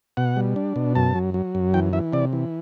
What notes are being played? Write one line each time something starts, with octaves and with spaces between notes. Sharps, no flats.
B2 F#5
G3
D4
B2
F#2 A5
F#3
F#3
F#2
E3 G5
E3 E5
C3 D5
E3